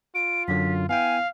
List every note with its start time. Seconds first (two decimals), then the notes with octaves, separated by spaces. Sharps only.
0.15 F4 D7
0.48 F#2 D3 F#3 B6
0.89 B3 E4 F5 G5 G#5